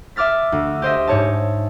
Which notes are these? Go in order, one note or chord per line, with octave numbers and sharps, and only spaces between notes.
E5 D6 F6 A6 B6
D2
G4 C5 D#5 E5
G#2 C#5 A5